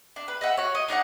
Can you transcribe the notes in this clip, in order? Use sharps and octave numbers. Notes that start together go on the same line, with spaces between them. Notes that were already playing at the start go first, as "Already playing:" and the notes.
D4
B4
D#5 E5 F#5
F#4 C#5
D#5
D4 D#4 C#5 F#5